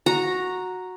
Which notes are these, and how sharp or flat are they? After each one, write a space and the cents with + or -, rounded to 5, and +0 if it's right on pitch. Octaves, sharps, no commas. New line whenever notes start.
F#4 -10 A#5 +0